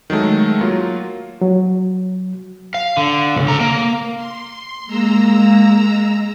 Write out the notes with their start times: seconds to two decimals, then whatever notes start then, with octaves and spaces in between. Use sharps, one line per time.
0.10 D#3 F#3 G#3 A3
0.61 F#3 A#3 F4
1.41 F#3
2.74 F5
2.97 D3
3.36 B1 C#3
3.48 A4 A#5
3.61 A#3
4.15 C6
4.87 G#3 A#3 A#5 E6